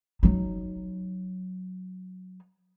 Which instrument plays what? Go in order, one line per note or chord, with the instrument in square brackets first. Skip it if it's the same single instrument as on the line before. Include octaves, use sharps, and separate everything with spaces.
[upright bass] F#3 D#4